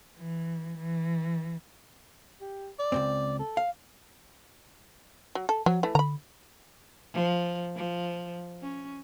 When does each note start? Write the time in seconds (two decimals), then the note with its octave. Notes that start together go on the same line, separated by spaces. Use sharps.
0.17 E3
0.77 E3
2.41 G4
2.79 D5
2.92 C#2 F#2 C4
3.39 A4
3.57 F5
5.35 F#3
5.49 A4
5.66 F3 F#3
5.83 E3 A3
5.95 D3 A#5 B5
7.14 F3
7.76 F3
8.62 C#4